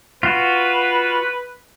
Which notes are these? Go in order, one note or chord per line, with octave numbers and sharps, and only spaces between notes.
F4 F#4 B4